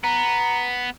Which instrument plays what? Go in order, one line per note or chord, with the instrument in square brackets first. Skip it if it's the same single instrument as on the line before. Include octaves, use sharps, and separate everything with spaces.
[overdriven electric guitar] B3 [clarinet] A#5